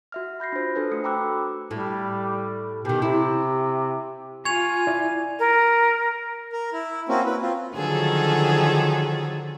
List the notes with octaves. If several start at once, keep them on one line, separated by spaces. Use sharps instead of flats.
F#4 E5 F6
B5 G6 A#6 C7
D4 F4 C5
D4 A4 B4 C5
A3 F#4 D#6 C#7
G5 A#5 B5 D6 E6 F#6
A2 G3
B2 D#3 G4
C3 E4
F4 G#5 C#6 G#6 F7
E4 D5
A#4
A#4
E4
A#3 C4 C#4 E4 F#4
B4
C4 F4
D3 D#3 F3 F#3 G#4 A4